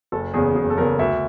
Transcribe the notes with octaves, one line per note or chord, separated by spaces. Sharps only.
F#1 A4
E2 C#3 G#4
F#1 G#4
A4
E2 C#3 A#4
D2 E5